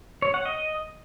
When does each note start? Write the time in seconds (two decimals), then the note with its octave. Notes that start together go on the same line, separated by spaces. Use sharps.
0.22 C#5
0.34 F#5
0.45 D#5